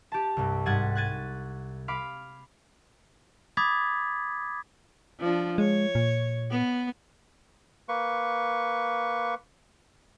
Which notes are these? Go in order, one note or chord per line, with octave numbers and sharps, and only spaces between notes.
G4 A5
C2 G2
G#2 G3 F#5 G#6 A6 D#7
F#6 G#6 A6 D#7
F5 B5 D6
B5 D6 D#6 G#6 A6 B6
F3 D4
G#3 C#5
A#2
B3
A#3 B4 C#6